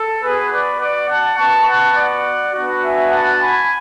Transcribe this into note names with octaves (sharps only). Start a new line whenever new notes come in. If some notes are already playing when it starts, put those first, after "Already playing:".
Already playing: A4
B3 F#4 G#4 B4
B4 D5
D5 F#5
F#5 A5
B3 F#4 A5 C#6
F#5 A5
D5 F#5
B3 D4 F#4
E5 G#5
F#5 A5
G#5 B5